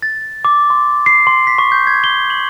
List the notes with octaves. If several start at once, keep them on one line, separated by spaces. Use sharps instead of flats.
A6
D6
C6
C7
C6
B6
C#6
G6
G#6
G7
F#7